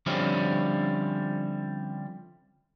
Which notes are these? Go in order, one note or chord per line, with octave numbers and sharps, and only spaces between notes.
D3 F3 G3 C4 C#4 E4